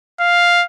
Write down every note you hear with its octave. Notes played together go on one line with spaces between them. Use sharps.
F5